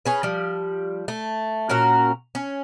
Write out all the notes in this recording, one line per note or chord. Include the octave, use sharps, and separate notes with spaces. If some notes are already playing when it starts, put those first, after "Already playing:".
C#4 G#4 B4
F3 G3
A3
A#2 C#4 F#4 A#4
C#4